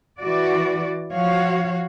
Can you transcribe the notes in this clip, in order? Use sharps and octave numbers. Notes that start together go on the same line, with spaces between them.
E3 F#4 D5
F3 F#4 C#5 F5